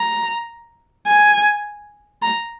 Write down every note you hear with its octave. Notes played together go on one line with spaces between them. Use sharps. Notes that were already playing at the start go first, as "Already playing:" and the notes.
Already playing: A#5
G#5
A#5